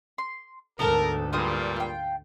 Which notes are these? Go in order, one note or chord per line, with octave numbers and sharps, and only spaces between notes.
C6
D2 G#2 B3 A4 A#4 A5
G2 A#2 G3 F4 C5 D#6
F4 G5